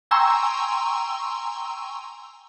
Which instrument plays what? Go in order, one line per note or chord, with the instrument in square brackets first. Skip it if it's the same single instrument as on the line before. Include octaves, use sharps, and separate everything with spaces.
[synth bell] G5 G#5 A#5 C6 C#6 E6